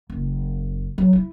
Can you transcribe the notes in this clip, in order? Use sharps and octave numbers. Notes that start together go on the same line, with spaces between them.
F#1
F#3
E4